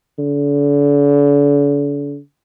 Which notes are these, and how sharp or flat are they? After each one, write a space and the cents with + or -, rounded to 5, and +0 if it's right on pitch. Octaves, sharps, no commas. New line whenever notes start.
D3 -40